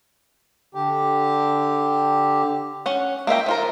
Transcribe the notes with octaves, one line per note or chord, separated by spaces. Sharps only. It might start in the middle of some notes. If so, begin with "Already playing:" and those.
D3 G4
C#4 F#5
A#3 A#4 E5 G5
F3 F4 A#4